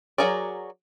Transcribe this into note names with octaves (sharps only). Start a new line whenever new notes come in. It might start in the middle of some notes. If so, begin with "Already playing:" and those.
F#3 F#4 G#4 A#4 D5